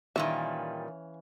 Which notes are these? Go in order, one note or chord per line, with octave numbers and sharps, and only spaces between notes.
A#2 D#3 E3 G3 C#4 E5 F5